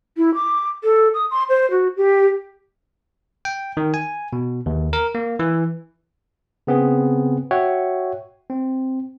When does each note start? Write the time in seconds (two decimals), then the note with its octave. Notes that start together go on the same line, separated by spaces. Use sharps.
0.17 E4
0.34 D6
0.84 A4
1.14 D#6
1.31 C6
1.49 C5
1.71 F#4
1.97 G4
3.45 G5
3.77 D#3
3.94 G#5
4.33 B2
4.66 D#2
4.93 A#4
5.15 A#3
5.39 E3
6.67 C#3 B3 C4 G#4
7.51 F#4 C#5 E5 F#5 G5
8.50 C4